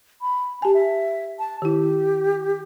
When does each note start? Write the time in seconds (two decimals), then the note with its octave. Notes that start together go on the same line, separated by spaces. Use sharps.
0.21 B5
0.62 G4 G#5 A5
0.74 E5
1.39 A5
1.62 D#3 E4 G4